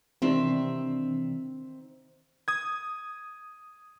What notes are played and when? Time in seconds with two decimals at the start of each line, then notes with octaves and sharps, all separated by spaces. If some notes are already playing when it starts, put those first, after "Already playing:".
0.22 C3 D#3 E3 C4 D4 E5
2.48 D#6 G#6